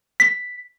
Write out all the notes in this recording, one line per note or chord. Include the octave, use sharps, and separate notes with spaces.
B6